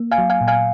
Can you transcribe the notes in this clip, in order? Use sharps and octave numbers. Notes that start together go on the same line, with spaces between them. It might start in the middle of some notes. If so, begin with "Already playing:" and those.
Already playing: A#3
F5 G#5
F#3
F5 G#5
A#2
F5 G#5